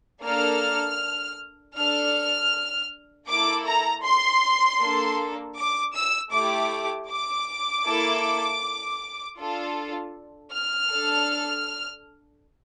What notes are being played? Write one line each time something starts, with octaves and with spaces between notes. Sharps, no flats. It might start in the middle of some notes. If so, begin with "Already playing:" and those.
A#3 D4 A4 F6
D4 A4 F6
A#3 E4 A4 D6
A#5
C6
A#3 D4 A4
D6
E6
A3 E4 G4 D6
D6
A#3 E4 A4
D4 F4 A4
F6
D4 A4